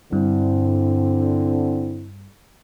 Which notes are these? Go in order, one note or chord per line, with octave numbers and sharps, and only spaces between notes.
G2 D3 C4 E4